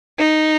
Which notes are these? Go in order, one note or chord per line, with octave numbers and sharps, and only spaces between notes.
D#4